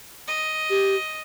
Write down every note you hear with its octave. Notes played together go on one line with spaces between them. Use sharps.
D#5
G4